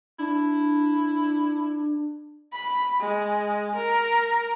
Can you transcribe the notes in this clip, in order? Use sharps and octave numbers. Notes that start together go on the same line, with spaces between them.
D4 E4
B5
G#3
A#4